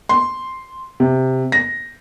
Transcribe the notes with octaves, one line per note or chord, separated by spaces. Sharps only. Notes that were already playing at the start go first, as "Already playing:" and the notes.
C6
C3
A#6